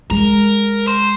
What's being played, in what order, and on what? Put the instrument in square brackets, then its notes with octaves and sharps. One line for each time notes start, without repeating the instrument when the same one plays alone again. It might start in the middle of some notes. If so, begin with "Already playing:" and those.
[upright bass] G#3 [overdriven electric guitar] A#4
[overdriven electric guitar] C5